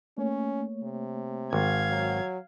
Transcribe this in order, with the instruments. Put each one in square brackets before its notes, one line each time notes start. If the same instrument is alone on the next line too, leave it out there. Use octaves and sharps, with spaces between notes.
[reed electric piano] A3 A#3 C#5 [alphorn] C#4
[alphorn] C3
[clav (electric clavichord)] G#1 [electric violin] F5 G#6
[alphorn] F#3